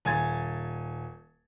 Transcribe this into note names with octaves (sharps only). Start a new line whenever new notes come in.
D#1 G#5 G#6 A6